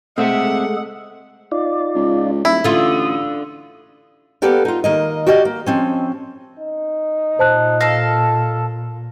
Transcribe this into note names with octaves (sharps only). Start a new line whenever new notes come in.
G#3 A3 C4 G#4 A4 C5 E5 F#5
D#4 F4 D5
C#2
D#1 E4
A1 D3 F4 D#6
A#3 B3 G4 A4 B4 D5
D#4 F4
D#3 A#3 D#5
F#4 G4 D5 D#5
A#3
F3 C4 C#4
D#4
A#2 C5 A5 F#6
A4 F5 A#6